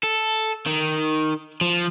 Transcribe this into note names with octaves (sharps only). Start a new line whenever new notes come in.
A4
D#3
F3